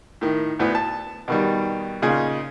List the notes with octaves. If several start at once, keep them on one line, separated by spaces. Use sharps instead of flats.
A2 D#3
D2 A2 B3
A5
B2 D#3 G3
A#2 C#3 D#4 F4 G#4